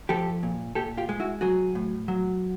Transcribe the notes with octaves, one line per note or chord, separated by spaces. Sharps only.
F3 G4 A4
A#2
A#2 G4 A4
F4 G4
G#3
E4 F#4
F#3 F#4 G#4
A2
F#3